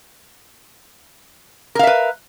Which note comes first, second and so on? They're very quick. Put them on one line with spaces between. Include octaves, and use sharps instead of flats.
A#4 F5 E5 B4